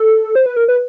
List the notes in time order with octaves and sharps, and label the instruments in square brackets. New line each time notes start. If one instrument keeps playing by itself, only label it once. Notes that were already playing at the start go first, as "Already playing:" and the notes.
Already playing: [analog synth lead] A4
C5
B4
A#4
B4